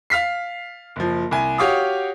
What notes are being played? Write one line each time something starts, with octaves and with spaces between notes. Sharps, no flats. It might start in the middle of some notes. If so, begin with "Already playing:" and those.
F5 F6 B6 C7
F#1 F3
C2 G#5
F#4 G4 C#5 F5 D6 D#6